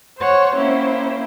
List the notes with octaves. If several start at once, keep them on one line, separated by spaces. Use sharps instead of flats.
C5 C#5 F#5
A#3 C4 C#4 E4 C5